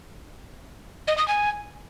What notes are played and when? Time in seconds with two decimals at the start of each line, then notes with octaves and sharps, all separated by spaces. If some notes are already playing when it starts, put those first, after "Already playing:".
1.07 D#5
1.18 D#6
1.28 G#5